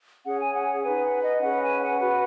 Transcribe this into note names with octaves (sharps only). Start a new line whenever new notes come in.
C#4 G#4 C#5 F#5
G#5
F#5
D#4 B4 G#5
F#5
D#5
C#4 G#4 B4 F#5
G#5
F#5
F#4 B4